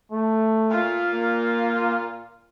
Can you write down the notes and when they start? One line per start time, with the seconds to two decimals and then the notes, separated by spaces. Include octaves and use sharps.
0.12 A3
0.71 A#2 F4
1.13 A#3